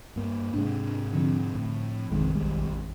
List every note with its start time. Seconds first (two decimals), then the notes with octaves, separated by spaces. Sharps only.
0.16 G2 A#3
0.54 G#2 C3 G#3 D4
1.13 D3 F3 C4
1.55 A2
2.11 D#1 A1 F2 C3 D#3 G#3
2.35 B1 G3 G#3